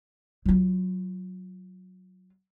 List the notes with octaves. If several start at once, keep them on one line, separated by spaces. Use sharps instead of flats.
F#3 F4